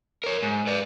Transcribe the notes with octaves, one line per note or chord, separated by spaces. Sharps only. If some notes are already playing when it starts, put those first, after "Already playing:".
A#4 C#5
G#2
B4 D5